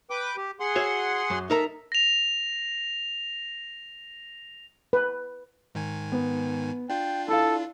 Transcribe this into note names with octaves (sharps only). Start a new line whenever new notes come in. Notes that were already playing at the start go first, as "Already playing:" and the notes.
B4 G5 D6
G4
G#4 F#5 C6
F#4 C#5 E5
F#2
D#4 A4 A#4 E5 A#5
A#6 F7
B4
G#2 D#3 G#5
B3
D4 F4 G5
E4 A4 F5